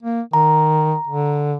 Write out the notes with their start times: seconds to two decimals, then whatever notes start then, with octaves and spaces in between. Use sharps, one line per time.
0.03 A#3
0.33 D#3 A#5
1.07 D3